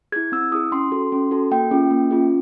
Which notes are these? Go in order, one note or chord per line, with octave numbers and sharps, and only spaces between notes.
E4 G#4 G#6
C4 E6
E4 G#4 D#6
C#4 C6
F#4 A4
C#4
F#4 A4
A#3 G5
C#4 F4 G#4
A#3
C#4 F4 G#4